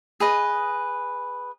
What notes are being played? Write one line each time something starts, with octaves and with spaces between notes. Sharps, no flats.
G#4 B4 D#5